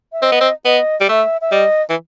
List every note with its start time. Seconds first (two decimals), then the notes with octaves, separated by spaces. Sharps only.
0.13 E5
0.22 C4 D#5
0.32 B3
0.41 C4
0.65 B3 D#5
1.01 G3
1.08 A3 E5
1.41 E5
1.52 G3 D#5
1.90 E3